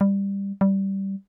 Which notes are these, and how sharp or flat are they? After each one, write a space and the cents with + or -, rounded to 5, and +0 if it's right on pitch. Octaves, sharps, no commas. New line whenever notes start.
G3 +15
G3 -10